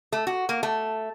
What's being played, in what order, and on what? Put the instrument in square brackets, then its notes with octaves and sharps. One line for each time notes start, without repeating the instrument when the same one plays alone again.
[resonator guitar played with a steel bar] A3
F#4
A#3
A3